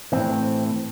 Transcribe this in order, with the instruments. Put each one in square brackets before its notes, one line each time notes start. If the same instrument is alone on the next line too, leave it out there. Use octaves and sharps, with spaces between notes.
[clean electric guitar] A2 E3 C4